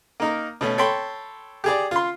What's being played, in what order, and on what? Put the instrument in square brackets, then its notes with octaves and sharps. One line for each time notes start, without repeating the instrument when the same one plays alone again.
[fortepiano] A#3 D#4 A#4
B2 A3 C#4
A4 C#5 G5 B5 C6
G4 G#4 D5
F4 C6